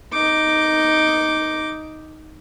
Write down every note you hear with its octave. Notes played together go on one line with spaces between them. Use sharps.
D#4 D6